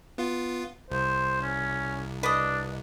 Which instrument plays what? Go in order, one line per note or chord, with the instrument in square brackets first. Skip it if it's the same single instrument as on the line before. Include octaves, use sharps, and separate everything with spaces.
[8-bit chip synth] B3 F4
[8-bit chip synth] C2 [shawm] C5
[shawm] C#4
[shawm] D4 [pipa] B4 D5 D#5